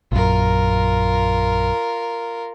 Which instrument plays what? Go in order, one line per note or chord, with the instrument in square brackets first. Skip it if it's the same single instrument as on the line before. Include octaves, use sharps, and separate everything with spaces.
[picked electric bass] A#1 F#2 [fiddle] F4 A#4